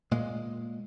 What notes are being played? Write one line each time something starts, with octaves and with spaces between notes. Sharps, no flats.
A#2 G#3